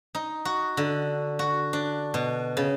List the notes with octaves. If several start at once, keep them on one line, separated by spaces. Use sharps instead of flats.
D#4
F#4
D3
F#4
D4
B2
C#3